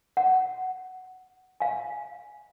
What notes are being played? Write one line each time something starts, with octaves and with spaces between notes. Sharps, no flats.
F#5
F5 G#5